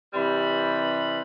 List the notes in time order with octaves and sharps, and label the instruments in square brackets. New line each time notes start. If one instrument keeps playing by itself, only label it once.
[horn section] C3 E3 G3 B4 B5